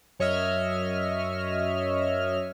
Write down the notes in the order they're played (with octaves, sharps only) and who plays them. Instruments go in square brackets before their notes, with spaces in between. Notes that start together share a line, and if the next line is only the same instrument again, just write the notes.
[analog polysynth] F#2 C#5 D#5 E5 F6